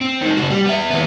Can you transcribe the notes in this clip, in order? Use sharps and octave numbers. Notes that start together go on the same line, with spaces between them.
C4
D#3 G#3
C#3 F#4
G3
B3 E5
D#2 B3